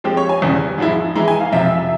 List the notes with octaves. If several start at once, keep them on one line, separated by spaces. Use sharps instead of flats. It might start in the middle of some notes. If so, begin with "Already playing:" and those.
F3 G#3 C4 G4
C#5
G#5
E2 C#3 G3
G#2 F3 G#3 E4
E3 G#3 E4 A#5
G#5
F5
F2 C3 F3 E5